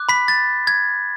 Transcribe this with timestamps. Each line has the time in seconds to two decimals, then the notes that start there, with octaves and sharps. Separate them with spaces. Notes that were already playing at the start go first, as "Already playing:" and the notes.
Already playing: D6 F#6
0.09 B5 B6
0.28 A6
0.67 G#6